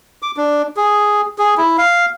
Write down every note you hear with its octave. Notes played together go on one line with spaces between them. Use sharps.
D6
D4
G#4
G#4
E4
F5